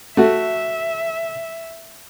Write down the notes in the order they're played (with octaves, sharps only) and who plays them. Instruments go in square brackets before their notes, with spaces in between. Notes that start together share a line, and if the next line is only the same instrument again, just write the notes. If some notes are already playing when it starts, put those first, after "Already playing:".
[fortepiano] A3 F#4 [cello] E5